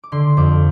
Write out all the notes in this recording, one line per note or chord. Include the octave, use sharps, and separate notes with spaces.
D6
D3 C6
F2 D6